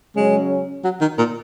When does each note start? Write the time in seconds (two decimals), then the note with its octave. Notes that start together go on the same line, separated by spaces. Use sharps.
0.16 C#3 F#3 G#3 C#4
0.84 F#3
1.01 D#3
1.18 A#2